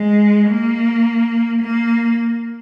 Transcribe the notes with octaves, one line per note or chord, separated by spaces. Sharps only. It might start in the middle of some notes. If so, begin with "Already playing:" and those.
Already playing: G#3
A#3
A#3